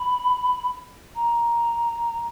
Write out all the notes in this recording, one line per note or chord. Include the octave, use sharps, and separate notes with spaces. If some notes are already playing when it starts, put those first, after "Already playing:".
Already playing: B5
A#5